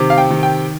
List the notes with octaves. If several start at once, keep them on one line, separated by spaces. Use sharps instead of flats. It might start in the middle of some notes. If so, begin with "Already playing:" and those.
Already playing: C3 D#3
F5
G5
D#3
G5